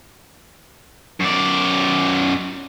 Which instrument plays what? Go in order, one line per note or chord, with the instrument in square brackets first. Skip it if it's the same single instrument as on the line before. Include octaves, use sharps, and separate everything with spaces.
[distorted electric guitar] F#2 D5